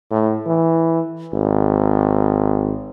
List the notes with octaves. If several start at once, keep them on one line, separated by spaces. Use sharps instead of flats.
A2
E3
G#1